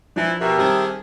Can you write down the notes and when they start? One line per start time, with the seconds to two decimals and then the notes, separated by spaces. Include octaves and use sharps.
0.16 E3 F3 C4 D4 E4
0.41 B2 G4 A#4 E5
0.58 D#3 G3 C4 G#4 A5